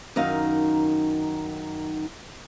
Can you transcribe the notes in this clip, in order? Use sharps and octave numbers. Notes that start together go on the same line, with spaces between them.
F#2 D#3 D#4 F5